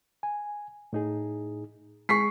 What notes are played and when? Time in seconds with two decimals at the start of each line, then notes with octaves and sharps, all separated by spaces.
0.23 G#5
0.93 A2 D#4 G#4
2.09 G#3 G#4 C#6 B6 C7